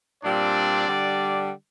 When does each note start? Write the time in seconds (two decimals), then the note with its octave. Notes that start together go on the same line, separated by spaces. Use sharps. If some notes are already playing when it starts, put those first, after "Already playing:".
0.23 A#2 G3 C4 D4 D5
0.87 D3 G3 D4